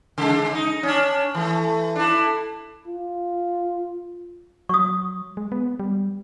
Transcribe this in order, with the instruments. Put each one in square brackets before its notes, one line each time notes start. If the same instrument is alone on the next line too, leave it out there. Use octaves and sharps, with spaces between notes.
[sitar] C#3 G#3
D#4
C#4 D4
E3 A3
D4 E4
[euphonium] F4
[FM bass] F#3 [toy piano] C#6 D#6
[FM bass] G#3
B3
G3